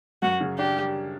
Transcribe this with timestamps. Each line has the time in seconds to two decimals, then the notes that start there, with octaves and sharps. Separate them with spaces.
0.22 F#2 F#4
0.41 C#3
0.58 D4 G4
0.77 G3